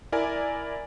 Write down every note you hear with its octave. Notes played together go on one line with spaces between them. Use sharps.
E4 A#4 D5 G#5